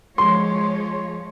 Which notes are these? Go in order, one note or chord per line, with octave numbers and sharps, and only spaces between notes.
F3 G#3 C#5 C6